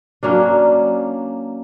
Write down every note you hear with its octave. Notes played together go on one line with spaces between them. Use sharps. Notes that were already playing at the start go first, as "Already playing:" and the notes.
F#3 A#3 C#4 D4